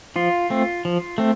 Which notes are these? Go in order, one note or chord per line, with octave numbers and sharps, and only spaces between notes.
F3 F4
A3 C4
F3
A3 C4